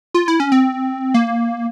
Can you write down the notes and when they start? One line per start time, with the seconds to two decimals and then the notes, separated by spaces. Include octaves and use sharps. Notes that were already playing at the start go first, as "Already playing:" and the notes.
0.14 F4
0.28 E4
0.40 C#4
0.52 C4
1.14 A#3